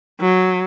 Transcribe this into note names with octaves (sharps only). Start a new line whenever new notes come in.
F#3